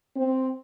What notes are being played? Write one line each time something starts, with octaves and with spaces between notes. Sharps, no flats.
C4